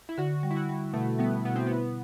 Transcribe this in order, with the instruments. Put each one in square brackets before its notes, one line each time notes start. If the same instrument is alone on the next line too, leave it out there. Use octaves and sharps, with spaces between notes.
[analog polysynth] E4
[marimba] D3 [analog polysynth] F#4
[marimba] G3
[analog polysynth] E4
F#4
[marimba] G3
[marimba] B2 [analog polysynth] A3
[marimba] G3 [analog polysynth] B3
[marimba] B2 [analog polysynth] B3
[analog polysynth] C4
[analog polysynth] B3 [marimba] E4